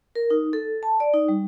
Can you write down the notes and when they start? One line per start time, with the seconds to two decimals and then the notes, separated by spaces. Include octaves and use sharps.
0.16 A#4
0.30 D#4
0.53 A4
0.83 A5
1.00 D5
1.14 D#4
1.28 G3